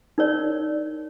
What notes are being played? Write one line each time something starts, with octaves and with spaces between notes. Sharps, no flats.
D#4 A#4 C#5 D5